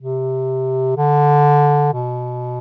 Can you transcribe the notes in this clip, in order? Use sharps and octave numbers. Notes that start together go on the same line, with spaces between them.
C3
D3
B2